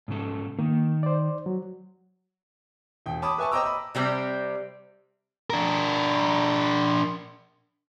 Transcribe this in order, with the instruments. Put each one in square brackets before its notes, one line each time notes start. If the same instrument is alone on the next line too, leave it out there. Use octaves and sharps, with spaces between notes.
[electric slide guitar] G#2 C#3 A4
[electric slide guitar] D#3 [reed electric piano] A#3
[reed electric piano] C5 D5
F#3
[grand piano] E1 G5
C#5 A5 B5 D6 D#6
B4 E5 G#5 A5 C#6
C5 D#5 G5 A#5 D6 E6
D#5 B5
[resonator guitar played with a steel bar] C3 G3 C4
[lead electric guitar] D4 A#4